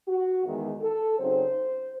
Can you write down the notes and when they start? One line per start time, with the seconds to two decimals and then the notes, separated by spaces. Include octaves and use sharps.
0.08 F#4
0.45 E2 D#3 G#3
0.81 A4
1.19 C#3 F#3 C4 D#4 C5